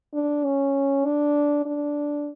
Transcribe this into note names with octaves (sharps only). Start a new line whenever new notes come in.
D4
C#4
D4
D4